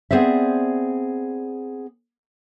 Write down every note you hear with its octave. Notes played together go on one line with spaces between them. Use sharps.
B3 C4 G#4 C5 D5 E5